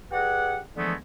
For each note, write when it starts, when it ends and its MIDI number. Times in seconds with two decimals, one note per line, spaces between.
0.12 0.59 67
0.12 0.59 68
0.12 0.59 71
0.12 0.59 74
0.12 0.59 78
0.76 0.94 50
0.76 0.94 52
0.76 0.94 53
0.76 0.94 56
0.76 0.94 57
0.76 0.94 59